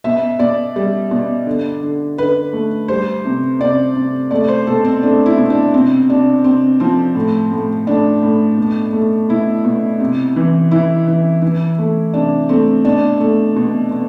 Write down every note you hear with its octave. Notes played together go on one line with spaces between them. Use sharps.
B2 E5
B2 D5
G3
B2
D3
D3
D3 B4
A3
G3 C5
C3
C3 D5
C3
A3 D5
C5
B2 A4
C4
A3 D4
E4
B2
D4
C3 C4
C3 D4
C3 C4
F3 C4
A2
A2
A2 D4
A2
B2
A3
B2 E4
B2
C3
E3
E3 E4
E3
E3
A3
C3 D4
A3 C4
B2 D4
A3
B2
B2